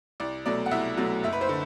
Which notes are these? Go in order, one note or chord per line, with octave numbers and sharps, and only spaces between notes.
C2 D5
B2 F#3 A3 D5
F#5
C2 E5
B2 F#3 A3
F#1 E5
B4
C5
D3